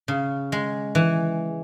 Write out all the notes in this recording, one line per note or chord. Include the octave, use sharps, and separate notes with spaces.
C#3
G#3
E3